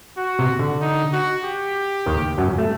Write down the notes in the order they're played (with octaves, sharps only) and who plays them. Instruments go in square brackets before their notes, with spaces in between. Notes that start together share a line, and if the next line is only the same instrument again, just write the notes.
[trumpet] F#4
[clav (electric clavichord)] C3
D3
[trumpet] D#4
F#4
G4
[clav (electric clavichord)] D#2 D#3
F#2 F#3
A3